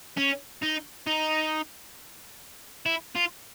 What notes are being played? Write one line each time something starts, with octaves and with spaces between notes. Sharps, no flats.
C#4
D#4
D#4
E4
F4